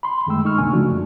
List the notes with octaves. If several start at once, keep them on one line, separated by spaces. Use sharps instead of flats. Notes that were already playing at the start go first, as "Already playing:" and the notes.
B5 C6
F#2 D#3 G#3 A3 G5 E6
G#3 D#4 C#6 F6
C#2 C3 A#3 D4 G#5
C#3 F3 A3 D4 F#4
F#2